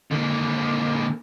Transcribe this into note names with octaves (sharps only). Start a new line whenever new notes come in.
D3 A#3